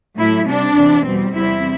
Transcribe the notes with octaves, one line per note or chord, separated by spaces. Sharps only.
A2 F#3 A3 E4
C3 G3 C4 D4
E2 C3 E3
E2 B2 G3 C4
E2 C3 G3 C4 E4